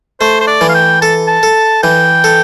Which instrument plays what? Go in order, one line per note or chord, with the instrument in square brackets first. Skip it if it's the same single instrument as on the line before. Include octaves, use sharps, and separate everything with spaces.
[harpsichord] A3 [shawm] C5
[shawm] C5
D5
[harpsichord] E3
[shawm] F5
G5
[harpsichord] A4 [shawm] A5
[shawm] A5
[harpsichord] A4
[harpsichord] E3 [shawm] G5
[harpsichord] A4